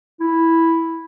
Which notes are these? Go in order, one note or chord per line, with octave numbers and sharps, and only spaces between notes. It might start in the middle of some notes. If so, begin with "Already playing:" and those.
E4